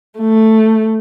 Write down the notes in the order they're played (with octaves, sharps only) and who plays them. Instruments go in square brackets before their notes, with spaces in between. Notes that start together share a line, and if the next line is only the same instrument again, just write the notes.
[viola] A3